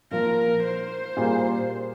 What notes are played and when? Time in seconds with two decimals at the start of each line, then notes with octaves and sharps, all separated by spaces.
0.11 A#2 F3 A#3 A#4
0.63 C5
1.16 A#2 G3 A#3 F4 G#4